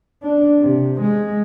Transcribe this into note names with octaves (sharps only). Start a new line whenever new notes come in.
D4
C3
G#3